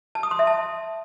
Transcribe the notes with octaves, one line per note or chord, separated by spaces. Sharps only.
A5
D#6
C6
E5
A5